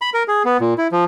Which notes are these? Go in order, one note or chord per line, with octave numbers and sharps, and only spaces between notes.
B5
A#4
G#4
B3
A#2
E4
F3